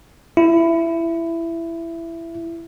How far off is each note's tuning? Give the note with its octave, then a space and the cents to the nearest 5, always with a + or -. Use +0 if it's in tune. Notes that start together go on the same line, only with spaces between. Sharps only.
E4 +15